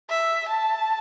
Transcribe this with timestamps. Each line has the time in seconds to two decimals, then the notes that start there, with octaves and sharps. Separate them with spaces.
0.09 E5
0.48 A5